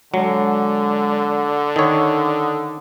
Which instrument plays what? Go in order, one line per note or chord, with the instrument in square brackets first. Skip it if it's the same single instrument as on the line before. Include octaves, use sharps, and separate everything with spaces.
[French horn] D3 [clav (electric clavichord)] F#3 [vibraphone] G#3
[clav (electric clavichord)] D#3 C#5 [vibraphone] D#6